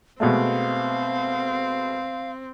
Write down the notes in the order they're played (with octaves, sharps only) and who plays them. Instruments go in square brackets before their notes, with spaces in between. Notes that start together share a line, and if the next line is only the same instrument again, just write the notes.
[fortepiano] B2 G#3 A3 [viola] C4 [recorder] F5